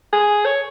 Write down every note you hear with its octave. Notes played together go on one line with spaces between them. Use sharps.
G#4
C#5